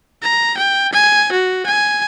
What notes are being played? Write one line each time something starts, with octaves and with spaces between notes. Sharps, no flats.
A#5
G5
G#5
F#4
G#5